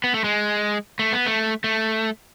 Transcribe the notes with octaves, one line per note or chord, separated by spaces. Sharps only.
B3
A3
G#3
A3
B3
A3
A3